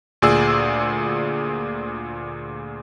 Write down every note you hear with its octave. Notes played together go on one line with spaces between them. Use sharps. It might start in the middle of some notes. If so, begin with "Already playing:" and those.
D2 A#2 G#4 D5 E6